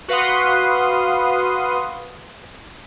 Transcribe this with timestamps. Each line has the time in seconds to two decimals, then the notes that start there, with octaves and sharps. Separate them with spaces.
0.08 F#4 B4 F5 F#5 C6 D#6